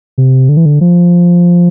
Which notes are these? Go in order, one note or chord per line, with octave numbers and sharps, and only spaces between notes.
C3
D3
E3
D3
F3